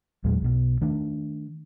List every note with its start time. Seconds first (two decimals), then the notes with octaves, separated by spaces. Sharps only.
0.24 E2 A#2 F#3 G#3
0.42 B1 B2
0.81 D#3 A3 D4